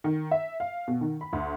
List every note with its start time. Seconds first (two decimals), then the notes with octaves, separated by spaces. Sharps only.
0.04 D#3
0.31 E5
0.60 F5
0.88 B2
1.01 D#3
1.21 B5
1.33 D2